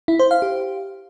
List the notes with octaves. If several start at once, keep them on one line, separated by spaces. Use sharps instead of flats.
E4
C5
F5
G4